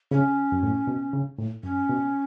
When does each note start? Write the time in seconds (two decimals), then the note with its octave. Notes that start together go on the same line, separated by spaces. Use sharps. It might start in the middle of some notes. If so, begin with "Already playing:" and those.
0.11 C#3 C#4
0.52 F#2
0.63 A2
0.87 B2
1.13 C#3
1.39 A2
1.64 F#2 C#4
1.89 B2